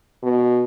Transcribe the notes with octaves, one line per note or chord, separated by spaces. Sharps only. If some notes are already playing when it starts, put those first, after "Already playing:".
B2